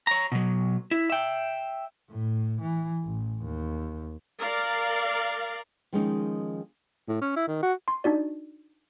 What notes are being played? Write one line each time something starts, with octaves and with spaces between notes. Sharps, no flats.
C#5 A#5
B2 F#3
E4
E5 G5
A2
E3
A1
D#2
A#4 D5 F5
D#3 F3 G#3 A#3 C#4 D#4
A2
C#4
E4
D#3
F#4
C6
D4 D#4 F#4 D5